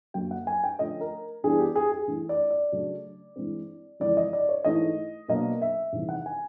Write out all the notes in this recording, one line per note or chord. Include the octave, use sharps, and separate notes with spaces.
F#2 D3 F#3 A#3 G5
F#5
G#5
G5
D3 F3 A3 C#4 D#5
A#4
G2 E3 G3 B3 D4 G#4
G4
G#4
G#4
G2 E3 A3
D5
D5
C#3 F#3 A3 D4
G2 E3 G#3 C4
F2 C#3 E3 G#3 D5
D#5
D5
C#5
G#2 E3 A3 D#5
B2 F#3 A#3 D4 D#5
E5
E2 C3 D#3 G3
F#5
G#5